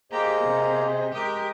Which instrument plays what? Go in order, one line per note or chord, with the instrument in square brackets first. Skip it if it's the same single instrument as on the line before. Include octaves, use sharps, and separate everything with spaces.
[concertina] A#3 A#5 [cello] G4 [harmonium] G#4 C5 D#5
[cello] C3
[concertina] G#3 D#6 [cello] G4 A#4